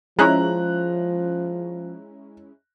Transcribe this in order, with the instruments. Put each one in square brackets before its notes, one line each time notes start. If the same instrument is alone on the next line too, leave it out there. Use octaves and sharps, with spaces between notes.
[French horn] F3 [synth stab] G#3 C#4 E4 [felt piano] A#5 F#6